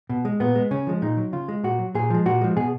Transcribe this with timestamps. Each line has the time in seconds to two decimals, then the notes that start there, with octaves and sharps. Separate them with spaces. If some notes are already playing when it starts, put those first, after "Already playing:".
0.10 B2
0.25 G#3
0.40 A#2 B3
0.55 G#3
0.71 C#3 C#4
0.87 F3 G#3
1.02 A#2 D#4
1.17 F#3
1.33 C#3 F4
1.48 G#3
1.64 A#2 F#4
1.79 F#3
1.95 A#2 G#4
2.10 F3 G#3
2.26 A#2 F#4
2.41 F3 G#3
2.56 B2 G#4